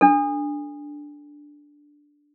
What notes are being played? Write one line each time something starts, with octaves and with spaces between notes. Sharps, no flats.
D4 A4